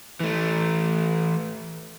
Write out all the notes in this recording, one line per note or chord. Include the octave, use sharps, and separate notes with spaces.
E3 A3